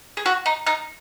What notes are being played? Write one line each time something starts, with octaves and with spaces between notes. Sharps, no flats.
G#4
F#4
D#4
D#4